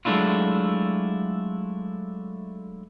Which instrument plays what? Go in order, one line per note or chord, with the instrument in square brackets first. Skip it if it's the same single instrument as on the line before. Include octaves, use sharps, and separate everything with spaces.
[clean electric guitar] F#3 G#3 A3 D4 E4 F4